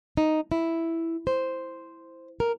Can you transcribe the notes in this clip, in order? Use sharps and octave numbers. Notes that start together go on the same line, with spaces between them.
D#4
E4
C5
A#4